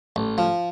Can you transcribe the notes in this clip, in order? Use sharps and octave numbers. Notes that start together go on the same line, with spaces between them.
A1
F3